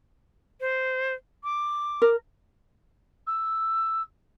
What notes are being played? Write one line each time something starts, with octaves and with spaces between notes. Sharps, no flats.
C5
D6
A#4
E6